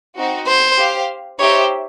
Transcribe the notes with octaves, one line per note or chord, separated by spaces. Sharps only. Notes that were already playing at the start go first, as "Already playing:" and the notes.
C4 D#4 F#4
C5
G4 C5 F5
D#4 G4 C5 C#5 E5